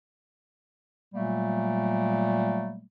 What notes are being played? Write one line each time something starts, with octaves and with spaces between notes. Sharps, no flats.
A#2 F#3 G3 A3 A#3